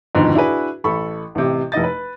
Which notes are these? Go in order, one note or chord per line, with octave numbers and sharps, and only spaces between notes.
F2 G#2 B2 D3 D#3 F3
D4 E4 F#4 G#4 B4
A1 A4 B5 C#6
A1 C3
F1 E4 D#5 A6
B4